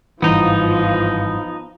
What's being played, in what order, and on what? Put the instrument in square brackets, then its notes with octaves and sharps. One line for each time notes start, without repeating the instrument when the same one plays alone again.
[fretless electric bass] G#1 G2 E3 [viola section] F3 [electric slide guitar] B3 D#4